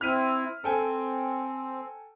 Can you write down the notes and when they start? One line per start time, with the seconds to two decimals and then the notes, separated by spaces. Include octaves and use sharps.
0.01 C4 E4 F6 B6 D#7
0.64 C4 A4 G5 G#5